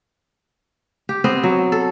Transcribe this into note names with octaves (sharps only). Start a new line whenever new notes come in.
G4
B3 C4 D#5
F#3
A4